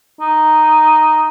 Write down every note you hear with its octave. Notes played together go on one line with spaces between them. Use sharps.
D#4